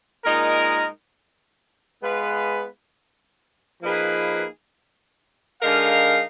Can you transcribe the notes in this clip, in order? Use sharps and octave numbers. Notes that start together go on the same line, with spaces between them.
A#2 G#3 D#4 A#4
G#3 B3 F4 B4
F3 A#3 D#4 G#4 B4
D3 G#3 D#4 A#4 F5